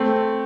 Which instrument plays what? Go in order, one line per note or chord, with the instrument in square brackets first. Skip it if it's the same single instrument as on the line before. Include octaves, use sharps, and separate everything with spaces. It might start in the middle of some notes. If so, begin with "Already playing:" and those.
Already playing: [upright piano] A3 C4